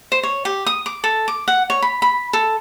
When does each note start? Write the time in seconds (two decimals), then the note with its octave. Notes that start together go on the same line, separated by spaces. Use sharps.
0.12 C5
0.23 C#5
0.45 G4
0.67 D#6
0.86 D6
1.04 A4
1.28 D6
1.48 F#5
1.70 C#5
1.82 B5
2.02 B5
2.33 A4